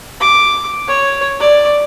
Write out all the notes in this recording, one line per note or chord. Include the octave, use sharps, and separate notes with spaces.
D6
C#5
D5